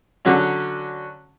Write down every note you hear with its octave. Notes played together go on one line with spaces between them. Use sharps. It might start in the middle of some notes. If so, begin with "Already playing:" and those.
D3 F#3 C#4